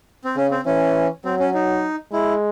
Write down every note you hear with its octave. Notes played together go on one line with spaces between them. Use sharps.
C4
C#3 C#4
C4
E3 C#4
F#3 C4
C#4
D#4
G#3 E4